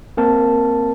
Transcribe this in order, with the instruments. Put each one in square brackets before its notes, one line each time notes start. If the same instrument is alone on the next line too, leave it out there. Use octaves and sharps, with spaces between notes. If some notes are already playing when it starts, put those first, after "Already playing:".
[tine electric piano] A#3 C4 A#4 A5